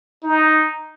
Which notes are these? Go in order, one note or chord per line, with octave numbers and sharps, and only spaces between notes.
D#4